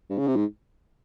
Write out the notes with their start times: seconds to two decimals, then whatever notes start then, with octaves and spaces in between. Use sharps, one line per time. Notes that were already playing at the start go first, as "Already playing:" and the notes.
0.10 G2
0.18 C#3
0.27 C3
0.36 G#2